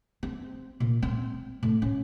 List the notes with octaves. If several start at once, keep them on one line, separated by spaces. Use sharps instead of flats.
C4
A#2
C4
A2
C#4